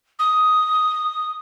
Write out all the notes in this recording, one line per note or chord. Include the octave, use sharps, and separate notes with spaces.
D#6